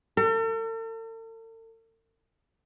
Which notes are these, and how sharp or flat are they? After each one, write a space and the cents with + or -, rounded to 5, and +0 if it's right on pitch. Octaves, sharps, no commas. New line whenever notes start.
A4 +45